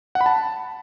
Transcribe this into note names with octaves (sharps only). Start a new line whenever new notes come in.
F#5
B5
A5